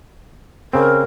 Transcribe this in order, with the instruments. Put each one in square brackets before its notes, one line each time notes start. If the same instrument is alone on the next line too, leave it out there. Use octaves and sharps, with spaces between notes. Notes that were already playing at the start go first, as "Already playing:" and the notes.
[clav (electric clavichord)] C#3 C4 [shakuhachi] A#4